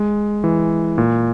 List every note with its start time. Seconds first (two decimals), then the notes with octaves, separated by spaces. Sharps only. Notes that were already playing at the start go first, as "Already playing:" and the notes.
Already playing: G#3
0.44 E3
0.98 A#2